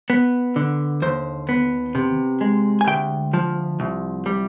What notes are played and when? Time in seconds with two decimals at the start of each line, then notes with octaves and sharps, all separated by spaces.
0.10 B3
0.56 D3
1.02 D#2 C5
1.49 B3
1.95 C3
2.41 G#3
2.81 G#5
2.87 D2 G5
3.33 F3
3.80 C2
4.26 G3